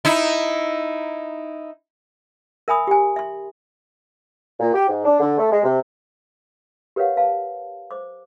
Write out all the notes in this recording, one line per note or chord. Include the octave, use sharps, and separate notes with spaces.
D#4 E4
A#4 E5 G#5 B5 D#6
G4 G#5
E5 C6
A#2
G4
G#2
D4
D3
A3
G#3
C3
G4 A#4 B4 C#5 F5 F#5
B4 F5 A5
C5 D6